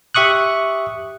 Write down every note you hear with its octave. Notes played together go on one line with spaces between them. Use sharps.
G4 E5 C#6 D#6 F#6